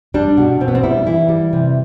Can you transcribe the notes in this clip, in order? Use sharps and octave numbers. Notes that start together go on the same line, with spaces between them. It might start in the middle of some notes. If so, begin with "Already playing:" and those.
G3 D4
B2
B2 C4
B3
C4
G3 E4
E3 E4
G3
C3